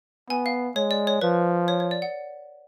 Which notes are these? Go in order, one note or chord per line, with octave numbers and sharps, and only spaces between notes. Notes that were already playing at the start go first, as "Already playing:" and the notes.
B3 G#5
F5
G#3 C#5
D5
C#5
F3 B4
C#5
C#5
D5
F#5